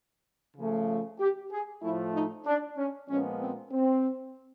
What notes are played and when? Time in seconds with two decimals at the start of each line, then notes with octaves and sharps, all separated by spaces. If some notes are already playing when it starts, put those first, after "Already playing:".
0.57 C#3 F3 A3
1.20 G4
1.51 G#4
1.83 A2 F3 A3 E4
2.14 D#4
2.46 D4
2.77 C#4
3.09 A#2 F3 G#3 B3 C#4
3.40 C4
3.72 C4